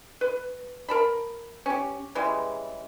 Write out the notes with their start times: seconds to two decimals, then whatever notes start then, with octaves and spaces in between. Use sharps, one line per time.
0.21 B4
0.89 A#4 A5 B5
1.66 C#4 G4
2.15 C#3 E3 G3 G#3